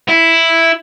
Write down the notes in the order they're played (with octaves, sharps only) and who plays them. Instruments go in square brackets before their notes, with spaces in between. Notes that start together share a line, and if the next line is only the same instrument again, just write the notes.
[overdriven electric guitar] E4